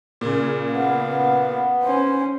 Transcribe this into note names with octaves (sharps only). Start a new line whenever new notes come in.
A#2 C#3
B3 F5
C#4 C5